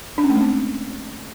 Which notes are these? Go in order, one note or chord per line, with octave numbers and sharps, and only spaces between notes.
D4
C#4
A3
G#3
C4